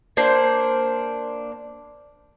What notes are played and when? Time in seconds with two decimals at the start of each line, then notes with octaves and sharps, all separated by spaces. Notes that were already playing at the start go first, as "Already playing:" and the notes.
0.17 A#3 D4 C5